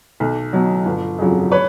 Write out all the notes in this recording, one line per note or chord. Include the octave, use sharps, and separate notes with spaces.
B1
B2 F#3
G1
F2 C#3 F#3
B4 C#5